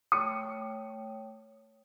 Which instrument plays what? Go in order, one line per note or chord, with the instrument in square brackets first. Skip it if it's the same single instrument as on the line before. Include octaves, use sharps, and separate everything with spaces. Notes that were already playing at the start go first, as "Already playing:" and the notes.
[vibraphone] A3 C#5 G5 [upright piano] D#6 C#7